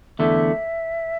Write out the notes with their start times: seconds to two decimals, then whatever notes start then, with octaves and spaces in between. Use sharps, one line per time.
0.19 E2 D3 A3 E5